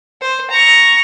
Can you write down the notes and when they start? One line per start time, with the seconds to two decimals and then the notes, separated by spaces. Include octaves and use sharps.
0.21 C5
0.51 A#5 C#6